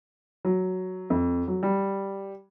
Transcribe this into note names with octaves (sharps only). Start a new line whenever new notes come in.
F#3
F2
F#3
G3